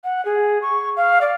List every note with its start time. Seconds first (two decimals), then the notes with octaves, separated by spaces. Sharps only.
0.04 F#5
0.25 G#4
0.62 C#6
0.97 F5
1.21 D5